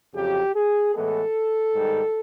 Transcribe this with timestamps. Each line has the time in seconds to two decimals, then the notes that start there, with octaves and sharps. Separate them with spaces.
0.14 F2 C#3 F#3 G4
0.54 G#4
0.95 A2 E3 G#3 B3 A4
1.75 G#2 D#3 G3